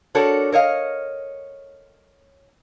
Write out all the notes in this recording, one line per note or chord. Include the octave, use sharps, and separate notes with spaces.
D4 F#4 A4 A#4 C#5
A#4 C#5 D#5 F5